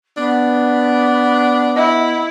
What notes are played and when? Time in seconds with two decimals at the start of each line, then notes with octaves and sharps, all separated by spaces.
0.17 B3 D4
1.76 E4 D#5